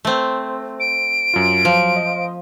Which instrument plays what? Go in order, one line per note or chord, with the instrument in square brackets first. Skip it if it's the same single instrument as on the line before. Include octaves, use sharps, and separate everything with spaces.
[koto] A3 C4
[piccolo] D7
[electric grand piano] F#2 F4
[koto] F3 [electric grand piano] F#3
[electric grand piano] D#5